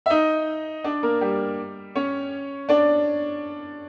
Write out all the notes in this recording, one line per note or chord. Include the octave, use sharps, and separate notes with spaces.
E5
D#4 D#5
D4 D5
A#3 A#4
G3 G4
C#4 C#5
D4 D5